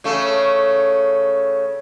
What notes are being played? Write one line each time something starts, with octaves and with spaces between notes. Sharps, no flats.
C#3 A3